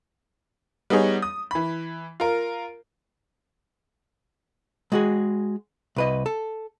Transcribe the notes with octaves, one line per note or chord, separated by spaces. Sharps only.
G3 B3 D#4 G#4 C#5
D#6
E3 B5
F4 A#4
G#3 F#4 G#4
C2 B4 D#5
A4